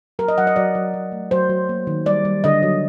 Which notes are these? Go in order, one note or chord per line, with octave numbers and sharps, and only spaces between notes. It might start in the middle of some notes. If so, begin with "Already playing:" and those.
F#3 A#4
D#5
F#3 F#5
D#5
F#3 D5
F#3
F#3
A3
F#3 C5
F#3
A#3
D#3
G3 D5
G3
D3 D#5
F#3